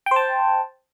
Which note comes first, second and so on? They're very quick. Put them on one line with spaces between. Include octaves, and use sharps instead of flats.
G5 C5 A5